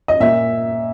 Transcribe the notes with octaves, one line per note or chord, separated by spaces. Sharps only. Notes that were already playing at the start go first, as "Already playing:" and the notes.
D#5
A#2 E5